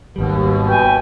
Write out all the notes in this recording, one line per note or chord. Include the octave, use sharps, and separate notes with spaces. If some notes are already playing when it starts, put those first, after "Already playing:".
G#1 D#2 B2 G3
B4 G5 G#5